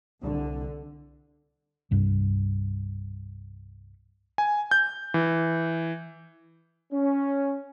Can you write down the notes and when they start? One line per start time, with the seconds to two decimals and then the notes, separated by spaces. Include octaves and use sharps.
0.23 C2 D3
1.91 C2 G2
4.38 G#5
4.71 G6
5.14 E3
6.92 C#4